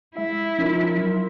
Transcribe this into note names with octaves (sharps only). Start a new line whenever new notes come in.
G#3 E4 E5
F3 C#4 D#4 F4 A#4
F#3